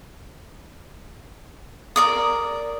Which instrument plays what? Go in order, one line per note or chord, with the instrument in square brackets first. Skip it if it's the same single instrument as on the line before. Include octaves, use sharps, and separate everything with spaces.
[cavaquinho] A#4 D5 D#6